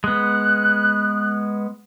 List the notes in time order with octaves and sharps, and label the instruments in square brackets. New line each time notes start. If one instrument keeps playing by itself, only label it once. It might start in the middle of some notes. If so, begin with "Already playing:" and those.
[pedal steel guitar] G#3 B3 [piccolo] F#6